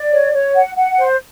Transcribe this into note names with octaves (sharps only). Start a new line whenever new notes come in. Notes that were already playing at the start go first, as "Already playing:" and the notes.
Already playing: D5
C#5
C#5
F#5
F#5
C5